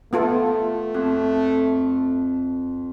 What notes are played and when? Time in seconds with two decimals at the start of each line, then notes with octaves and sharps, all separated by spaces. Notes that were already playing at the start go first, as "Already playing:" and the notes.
0.13 A3 B3 F4 A4
0.94 F2